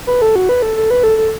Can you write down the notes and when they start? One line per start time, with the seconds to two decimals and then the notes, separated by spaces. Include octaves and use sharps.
0.07 B4
0.22 A4
0.36 F#4
0.49 B4
0.62 A4
0.77 A4
0.91 B4
1.03 A4
1.18 A4